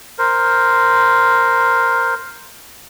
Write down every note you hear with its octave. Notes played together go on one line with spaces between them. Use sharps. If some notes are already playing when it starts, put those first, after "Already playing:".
A#4 C5